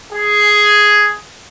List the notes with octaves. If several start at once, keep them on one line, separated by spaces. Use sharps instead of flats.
G#4